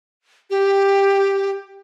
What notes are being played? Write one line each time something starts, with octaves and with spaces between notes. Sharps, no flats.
G4